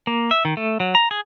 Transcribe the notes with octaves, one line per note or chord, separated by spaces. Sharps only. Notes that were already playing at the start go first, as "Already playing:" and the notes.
A#3
E5
D#3
A3
F#3
A#5
G#4